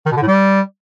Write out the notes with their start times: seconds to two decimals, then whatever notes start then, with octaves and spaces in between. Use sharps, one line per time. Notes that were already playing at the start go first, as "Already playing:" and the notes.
0.06 D#3
0.11 B2
0.17 D3
0.22 A2
0.27 G3